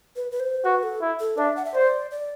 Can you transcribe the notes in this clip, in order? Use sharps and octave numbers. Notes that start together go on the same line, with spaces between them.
B4
B4
C5
F#4 B4
A4
E4
A4
D4 E5
F#5
E5
C5 D5
D5